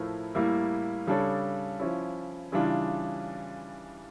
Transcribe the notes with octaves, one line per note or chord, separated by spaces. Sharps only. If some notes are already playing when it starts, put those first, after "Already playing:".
Already playing: A2 F3 A3 E4 A#4
A2 G3 A#3 E4
C#3 G3 D4 A4 C#5
F3 C#4 E4
C#3 E3 G3 D4 F4